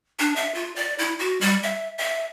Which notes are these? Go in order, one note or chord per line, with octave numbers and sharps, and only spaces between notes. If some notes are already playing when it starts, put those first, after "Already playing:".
D4
E5
F4
D5
E4
F#4
G3
E5
E5